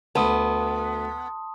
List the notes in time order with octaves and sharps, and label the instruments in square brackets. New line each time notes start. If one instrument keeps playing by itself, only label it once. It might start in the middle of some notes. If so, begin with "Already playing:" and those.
[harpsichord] D2 [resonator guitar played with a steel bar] B3 [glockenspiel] A5 C6 D#6